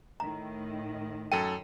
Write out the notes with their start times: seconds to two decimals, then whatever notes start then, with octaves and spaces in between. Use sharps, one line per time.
0.20 A2 D#3 A#5
1.32 F#2 A4 G5 D#7